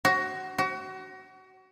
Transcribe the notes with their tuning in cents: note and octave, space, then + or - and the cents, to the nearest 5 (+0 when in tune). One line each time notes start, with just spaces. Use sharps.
F#4 +20
F#4 +30